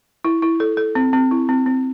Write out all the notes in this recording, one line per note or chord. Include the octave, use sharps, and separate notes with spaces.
E4
E4
A4
A4
C4
C4
E4
C4
C4